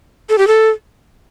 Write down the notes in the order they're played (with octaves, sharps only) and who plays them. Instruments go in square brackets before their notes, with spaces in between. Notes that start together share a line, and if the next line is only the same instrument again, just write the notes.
[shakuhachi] A4
G4
A4